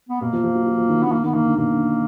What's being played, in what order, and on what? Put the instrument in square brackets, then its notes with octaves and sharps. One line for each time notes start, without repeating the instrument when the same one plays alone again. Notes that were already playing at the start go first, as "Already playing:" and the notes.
[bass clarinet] B3
[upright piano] B2 [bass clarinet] A#3
[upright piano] F3
F3
F#3
F#3
F3
D#3
D3
[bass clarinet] B3
[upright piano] D#3 [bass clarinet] A#3
[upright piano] D#3 [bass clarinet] B3
[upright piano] D#3 [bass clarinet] A#3
[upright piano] D3
[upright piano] B2 [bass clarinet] A#3
[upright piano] D3